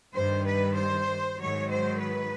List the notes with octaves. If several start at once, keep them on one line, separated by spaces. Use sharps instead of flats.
G2 D#3 G3 C5
B4
C5
G#2 D#3 F#3 C#5
C5
B4